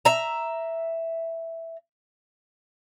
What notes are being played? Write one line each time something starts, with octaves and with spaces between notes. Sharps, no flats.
E5 A#5